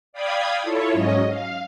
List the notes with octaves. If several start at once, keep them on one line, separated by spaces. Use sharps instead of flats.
D5 F5 G5 B5 D#6 G#6
E4 F4 A4 C#5
G#2 F#3 C#4 D#5
F5